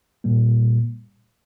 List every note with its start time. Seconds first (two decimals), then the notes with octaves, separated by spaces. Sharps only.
0.24 A#2 G3 A#3